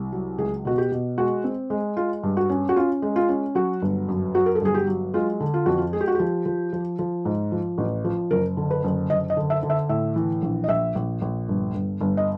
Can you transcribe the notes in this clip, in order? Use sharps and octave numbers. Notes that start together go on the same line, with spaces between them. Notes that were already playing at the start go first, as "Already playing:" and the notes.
Already playing: C2
F#3
C#2 G#4
B2 F#4
G4
B2
G#3 F#4
C4
G#3
G#3 F4
G2
F#4
C#4
F#4
C#4 F4
G#3
F4
C#4
F#3 F#4
G1
F#2
F#3 F#4
A#4
A4
G1 G#4
G4
F#3
G#3 F4
D3
F4
F2 F#4
F4
G#3 G#4
G4
F#4
F3 G4
F3
F3
F3
G#2
F3
A1
F3
F#1 A#4
D3
B4
F#1
F#1 D#5
D#5
D3
E5
D3
E5
A2 E5
E3
A#1
D#5
A#1 E5
A#1
A#1
G1
G1
G1
D#5